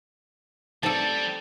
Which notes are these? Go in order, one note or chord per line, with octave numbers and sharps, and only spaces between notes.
G3 A3 C4 D#4 A4 D5 A5